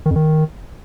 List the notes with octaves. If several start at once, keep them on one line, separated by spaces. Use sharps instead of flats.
D#3
F2
D#3